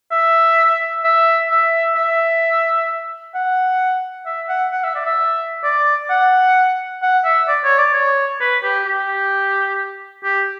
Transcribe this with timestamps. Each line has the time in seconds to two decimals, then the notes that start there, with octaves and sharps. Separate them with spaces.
0.12 E5
1.05 E5
1.51 E5
1.96 E5
3.35 F#5
4.26 E5
4.49 F#5
4.72 F#5
4.84 E5
4.95 D5
5.06 E5
5.64 D5
6.10 F#5
7.03 F#5
7.25 E5
7.48 D5
7.64 C#5
7.78 D5
7.94 C#5
8.40 B4
8.63 G4
8.86 G4
10.24 G4